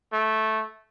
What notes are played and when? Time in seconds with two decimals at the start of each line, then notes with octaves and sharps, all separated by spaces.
0.13 A3